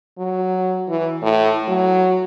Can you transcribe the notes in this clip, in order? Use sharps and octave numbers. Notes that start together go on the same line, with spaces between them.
F#3
E3
A2
F#3